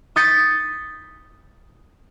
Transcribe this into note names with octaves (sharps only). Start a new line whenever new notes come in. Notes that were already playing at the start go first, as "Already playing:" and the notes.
D#6 G6 A6 B6 C#7